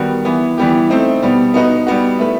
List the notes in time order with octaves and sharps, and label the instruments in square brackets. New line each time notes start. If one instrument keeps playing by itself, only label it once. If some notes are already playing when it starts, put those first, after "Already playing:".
Already playing: [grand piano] D#3 G3 B3 F#4
E3 B3 E4
E3 G3 B3 E4 G4
A3 C4 D#4
B2 G3 B3
B3 D#4 F#4 B4 D#5
G3 B3 F#4
A3 E4 B4